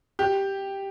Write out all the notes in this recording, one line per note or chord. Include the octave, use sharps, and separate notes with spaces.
G4